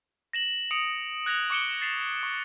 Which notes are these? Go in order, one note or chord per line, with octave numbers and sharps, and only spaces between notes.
A#6 E7 F#7
D#6 C#7 D7 F7
F#6 G#6 A#6 C#7 F7
C#6 D6 C#7 D7 G7
A6 C7 E7 F7
C#6